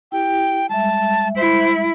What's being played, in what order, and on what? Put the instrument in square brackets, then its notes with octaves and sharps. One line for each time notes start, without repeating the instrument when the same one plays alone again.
[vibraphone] E4 G4 [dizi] G5
[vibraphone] G3 G#3 E5 [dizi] A5
[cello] E4 [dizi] C5